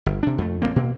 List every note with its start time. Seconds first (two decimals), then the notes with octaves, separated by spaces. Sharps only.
0.06 G1
0.23 C3 D4
0.38 F2 A3
0.62 A1 F3 A#3 C4
0.76 B2 A#3